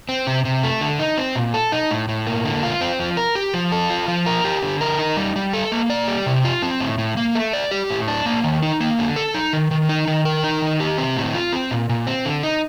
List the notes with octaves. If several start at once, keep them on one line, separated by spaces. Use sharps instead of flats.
C4
C3
C3
A3
D3
D#4
C4
A#2
A4
D#4
A2
A2
A#3
D3
F4
C4
F3
A#4
G4
F3
A4
F4
F3
A#4
G4
D3
A#4
D#4
G3
G3
A4
A#3
D5
G4
C3
F4
C4
A2
A2
A#3
A3
D5
G4
A2
D4
A#3
D#3
D#4
A#3
D3
A4
D#4
D#3
D#3
D#4
D#3
A#4
D#4
D#3
G4
C4
A2
F4
C4
A#2
A#2
C4
D3
D#4